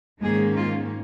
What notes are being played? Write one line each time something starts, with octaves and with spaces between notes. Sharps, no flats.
G#2 D#3 G#3 A#3 C#4 G#4
F4